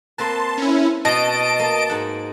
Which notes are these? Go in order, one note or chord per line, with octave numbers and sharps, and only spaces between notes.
A#3 C4 B4 A5 C6
C#4 E4
B2 D#5 A5 D7
A#3
G#2 F#5